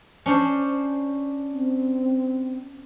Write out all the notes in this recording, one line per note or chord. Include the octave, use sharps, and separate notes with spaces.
C#4 D4 C5
C4